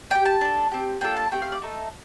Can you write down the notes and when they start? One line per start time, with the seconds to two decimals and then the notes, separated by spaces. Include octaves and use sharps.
0.10 D4 G4 G5
0.25 A5
0.41 D4 A4
0.71 C4 G4
1.01 A#3 D4 F4 A4 G5
1.17 A5
1.31 A3 C4 G4 G5
1.42 F5
1.52 D5
1.62 A3 D#4 A4